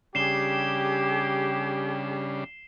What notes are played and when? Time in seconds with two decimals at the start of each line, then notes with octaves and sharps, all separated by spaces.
0.15 C#3 G3 D4 G4 G#4 C7 E7 G7